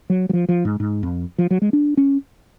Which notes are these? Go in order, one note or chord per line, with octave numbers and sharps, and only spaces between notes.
F#3
F#3
F3
F3
G#2
G#2
F2
F3
F#3
G#3
D4
C#4